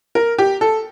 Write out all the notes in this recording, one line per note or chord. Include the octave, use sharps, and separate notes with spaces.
A#4
G4
A4